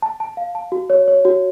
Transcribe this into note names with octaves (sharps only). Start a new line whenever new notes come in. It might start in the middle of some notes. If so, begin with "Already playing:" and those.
A5
A5
F5
A5
F#4
C#5
C#5
F#4